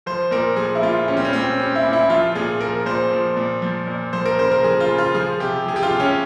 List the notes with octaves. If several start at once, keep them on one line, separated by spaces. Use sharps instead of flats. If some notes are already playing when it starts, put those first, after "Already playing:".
F3 C5
A#2 A#4
F3 G#4
E4
A#2 F4
G3 C#4
C4
C#4
A#2 C4
G3 C#4
E4
A#2
E4
F3 F4
A#2 G#4
F3 A#4
A#2 C5
F3
A#2
F3
A#2
F3 C5
A#4
C#3 C5
A#4
F3 G#4
F4
C#3
F4
F3 G#4
C3 G4
F3 G#4
G4
F4
C3
C#4